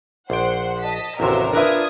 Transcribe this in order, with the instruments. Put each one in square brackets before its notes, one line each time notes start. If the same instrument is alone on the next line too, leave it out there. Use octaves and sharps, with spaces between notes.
[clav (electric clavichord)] A#1 G5 [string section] C5 F#5 C6
[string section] D#5 A5 B6
[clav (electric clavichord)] A1 D#2 C3 [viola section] F#3 F4 [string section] A#4 C5 E5
[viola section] D4 F4 [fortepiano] A#4 B4 E5 [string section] D#6 G#6